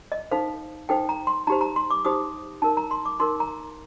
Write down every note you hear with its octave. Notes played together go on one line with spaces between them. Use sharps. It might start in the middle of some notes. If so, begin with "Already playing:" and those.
D#5
D#4 A4 C5 F5
D#4 A4 C5 G5
A#5
C6
D#4 G4 C5 A#5
A#5
C6
D6
D#4 G4 C5 D#6
D#4 A#4 A5
A#5
C6
D6
D#4 A#4 C6
A#5